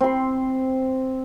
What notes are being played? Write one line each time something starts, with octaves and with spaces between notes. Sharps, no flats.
C4 C6